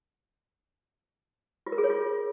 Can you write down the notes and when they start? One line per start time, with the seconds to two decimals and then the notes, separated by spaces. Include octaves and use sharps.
1.66 F4
1.72 A#4
1.78 G#4
1.84 C#5
1.90 F4